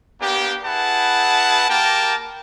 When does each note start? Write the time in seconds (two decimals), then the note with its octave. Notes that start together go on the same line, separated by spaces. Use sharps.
0.20 A#3 B3 D4 G4
0.64 E4 G#4 B4 F#5 A5
1.68 A#3 G4 A#4 G5 A5